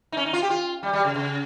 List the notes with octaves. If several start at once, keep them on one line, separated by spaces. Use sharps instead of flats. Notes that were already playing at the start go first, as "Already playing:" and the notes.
D#4
C#4
D#4
F4
G4
F4
G3
G3
C#3
C#3